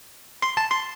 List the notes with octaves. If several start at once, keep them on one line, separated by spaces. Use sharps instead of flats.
C6
A5
C6